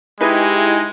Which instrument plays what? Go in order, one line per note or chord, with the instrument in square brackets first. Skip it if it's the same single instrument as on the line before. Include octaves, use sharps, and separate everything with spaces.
[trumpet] G#3 [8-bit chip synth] D#4 G#5 [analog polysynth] E4 G4 [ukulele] G#4 B4